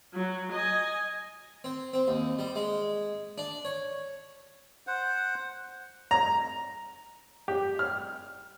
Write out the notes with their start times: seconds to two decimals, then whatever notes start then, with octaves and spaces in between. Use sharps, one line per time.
0.14 F#3
0.52 D#5 G#5
1.64 C4
1.93 C4
2.08 D#2
2.39 G3
2.56 G#3
3.38 D4
3.65 C#5
4.87 C5 F#5
6.11 A#5
7.48 G4
7.79 F6